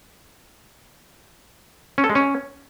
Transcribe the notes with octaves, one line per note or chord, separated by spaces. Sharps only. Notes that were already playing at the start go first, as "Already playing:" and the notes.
C#4
A4
G#3
C#4